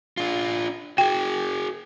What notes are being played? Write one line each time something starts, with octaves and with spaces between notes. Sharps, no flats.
D4 F4
F#4 G#4 G5